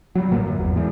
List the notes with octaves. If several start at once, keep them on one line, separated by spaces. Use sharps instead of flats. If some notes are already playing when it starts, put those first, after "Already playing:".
F#3 G3
A1 A2 D3 A#3
F#2
G#1 E2
E3 G#3